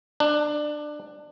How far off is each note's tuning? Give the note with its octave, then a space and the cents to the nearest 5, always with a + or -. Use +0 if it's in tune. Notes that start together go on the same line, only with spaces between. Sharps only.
D4 +20